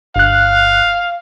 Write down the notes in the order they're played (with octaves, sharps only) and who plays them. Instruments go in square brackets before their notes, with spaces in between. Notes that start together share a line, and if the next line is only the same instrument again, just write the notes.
[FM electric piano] G1 F#6 [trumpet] F5